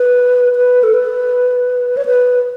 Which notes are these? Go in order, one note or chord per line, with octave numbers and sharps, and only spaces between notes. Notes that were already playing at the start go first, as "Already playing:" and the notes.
Already playing: B4
B4
A4
B4
C#5
B4